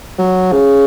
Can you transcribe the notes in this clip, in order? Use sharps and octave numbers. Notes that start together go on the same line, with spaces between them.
F#3
C#3